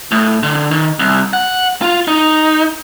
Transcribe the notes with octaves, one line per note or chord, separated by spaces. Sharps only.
A2
D3
D#3
C2
F#5
F4
D#4